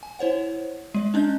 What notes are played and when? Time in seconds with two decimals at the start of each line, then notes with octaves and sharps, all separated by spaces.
0.03 G#5
0.19 E4 C5 C#5 F#5
0.94 G#3 D5
1.14 C#4 D4 D#5 G6